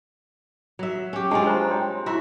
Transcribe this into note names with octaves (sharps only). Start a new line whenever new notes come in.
F#3 E5
C#4 G4
G#3 C4 D4 F4 G4 A5
C5 A#5
C#5 G5 C6
E4 F#4 E5 A#5 C6